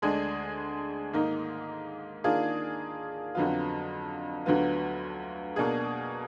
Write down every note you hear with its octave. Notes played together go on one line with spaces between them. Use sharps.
D2 D3 G#3 D4 G#4
G#2 D#3 A#3 D#4
D#3 A#3 D4 F4 G#4
F2 D3 F#3 B3 F4
D2 D3 F#3 B3 F4
B2 A#3 D4 G#4